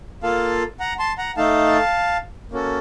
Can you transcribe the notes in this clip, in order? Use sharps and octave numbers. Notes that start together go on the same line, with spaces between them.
A#3 F4 A4 F5 A5
F#5 A#5
A5 C6
F#5 A#5
A3 D#4 A4 F5 A5
A#3 C#4 F#4 A4